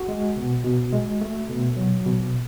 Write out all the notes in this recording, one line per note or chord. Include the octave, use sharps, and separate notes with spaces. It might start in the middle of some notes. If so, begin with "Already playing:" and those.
Already playing: F#4
G#3
B2
B2
G#3
A3
B2
F#3
B2